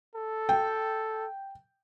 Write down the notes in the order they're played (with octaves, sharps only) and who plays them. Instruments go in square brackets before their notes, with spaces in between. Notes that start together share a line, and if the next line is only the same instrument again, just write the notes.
[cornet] A4
[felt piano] G5